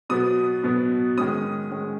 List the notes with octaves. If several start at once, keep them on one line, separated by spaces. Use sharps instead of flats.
B2 F#3 B3 D#6
B2 F#3 B3
D#3 G#3 C#4 D#6
D#3 G#3 C#4